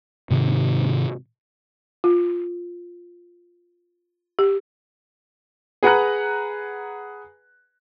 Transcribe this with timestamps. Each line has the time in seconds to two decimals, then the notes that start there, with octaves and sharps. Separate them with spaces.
0.31 G#2 C3 D#3
2.04 F4
4.39 G4
5.83 G#4 B4 F#5 G#5 A#5 F#6